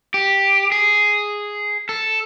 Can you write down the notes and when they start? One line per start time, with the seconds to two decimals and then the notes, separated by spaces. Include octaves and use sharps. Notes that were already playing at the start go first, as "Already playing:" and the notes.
0.14 G4
0.72 G#4
1.89 A4